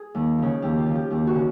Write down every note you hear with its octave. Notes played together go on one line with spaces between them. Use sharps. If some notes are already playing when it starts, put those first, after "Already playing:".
Already playing: G#4
D#2
C#3 F3
D#2 G4
F4
C#3 F3
G4
D#2 G4
F#4
C#3